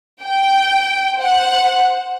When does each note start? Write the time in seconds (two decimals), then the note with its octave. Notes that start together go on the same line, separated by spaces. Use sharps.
0.22 G5
1.17 C5 F#5